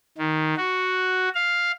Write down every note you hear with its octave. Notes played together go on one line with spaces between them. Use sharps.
D#3
F#4
F5